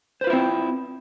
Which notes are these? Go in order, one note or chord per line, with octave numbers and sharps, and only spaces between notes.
C4 E4 F4 B4 C5